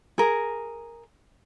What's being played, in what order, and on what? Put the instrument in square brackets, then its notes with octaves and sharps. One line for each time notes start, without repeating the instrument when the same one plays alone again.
[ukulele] G#4 A#4